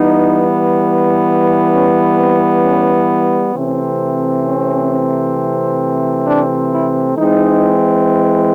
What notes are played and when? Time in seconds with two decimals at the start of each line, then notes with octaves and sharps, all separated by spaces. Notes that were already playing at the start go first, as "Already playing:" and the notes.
Already playing: E3 G3 B3 D#4
1.72 C#4
2.17 C4
2.62 C#4
3.54 C3 E3 A3 C4 C#4
4.45 C#4
6.27 D4
6.73 E4
7.18 E3 G#3 C4 D#4